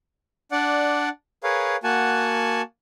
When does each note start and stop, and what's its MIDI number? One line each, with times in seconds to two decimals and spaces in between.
0.52 1.09 62
0.52 1.09 74
0.52 1.09 78
1.44 1.76 68
1.44 1.76 70
1.44 1.76 71
1.44 1.76 73
1.44 1.76 77
1.84 2.62 58
1.84 2.62 66
1.84 2.62 78
1.84 2.62 80
1.84 2.62 81